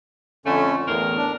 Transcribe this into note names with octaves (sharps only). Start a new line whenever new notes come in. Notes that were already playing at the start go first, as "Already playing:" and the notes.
F2 D3 A3 C#4
E2 A2 A#4
D4